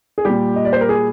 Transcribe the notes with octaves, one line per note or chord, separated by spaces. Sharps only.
G#4
A#2 G3 G4
D#5
D5
C5
A#4
G#4